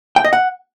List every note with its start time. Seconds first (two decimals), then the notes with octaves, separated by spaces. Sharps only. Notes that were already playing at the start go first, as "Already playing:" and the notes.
0.16 G5
0.24 D#5
0.33 F#5